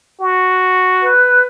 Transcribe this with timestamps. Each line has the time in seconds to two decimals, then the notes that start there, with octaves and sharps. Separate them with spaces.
0.21 F#4
1.02 B4